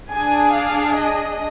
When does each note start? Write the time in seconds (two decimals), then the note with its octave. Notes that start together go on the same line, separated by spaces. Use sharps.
0.13 D4 G#4 G#5
0.56 F5
0.98 D#5